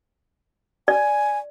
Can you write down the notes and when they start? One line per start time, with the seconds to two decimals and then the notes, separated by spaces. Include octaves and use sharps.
0.88 D5 G#5